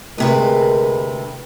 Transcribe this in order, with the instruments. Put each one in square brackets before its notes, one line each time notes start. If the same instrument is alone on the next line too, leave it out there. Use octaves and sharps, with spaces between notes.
[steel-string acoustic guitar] D2 C3 B4 [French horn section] G#3 A#4